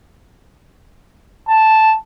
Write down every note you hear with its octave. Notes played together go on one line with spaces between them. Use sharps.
A5